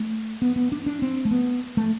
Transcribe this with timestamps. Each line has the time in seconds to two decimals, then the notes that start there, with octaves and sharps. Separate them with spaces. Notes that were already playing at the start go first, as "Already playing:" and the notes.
Already playing: A3
0.42 B3
0.56 B3
0.72 D4
0.86 D4
1.02 C4
1.25 A3
1.31 B3
1.77 A3